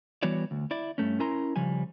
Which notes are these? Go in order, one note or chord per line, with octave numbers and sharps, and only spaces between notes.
E3 G3 B3 F#4 C#5 D5
D2
E4 D5
G2 A3 C#4
C#4 E4 A#4 G#5 A#5 C6
C#3 F3 G3 G#5